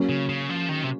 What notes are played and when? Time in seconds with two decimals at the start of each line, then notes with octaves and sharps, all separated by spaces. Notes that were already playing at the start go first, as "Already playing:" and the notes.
Already playing: F#3 A#3 C#4
0.09 C#3
0.29 C#3
0.49 F3
0.69 D#3
0.84 C3